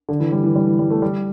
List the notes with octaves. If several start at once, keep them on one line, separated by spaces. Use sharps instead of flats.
D3
E3
G3
E3
G3
E3
G3
A3
G3